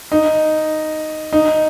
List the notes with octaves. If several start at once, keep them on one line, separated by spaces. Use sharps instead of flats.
D#4
D#4